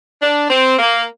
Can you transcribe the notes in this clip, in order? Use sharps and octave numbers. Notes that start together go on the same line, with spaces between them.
D4
C4
A#3